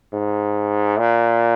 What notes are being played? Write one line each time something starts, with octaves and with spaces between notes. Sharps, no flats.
G#2
A#2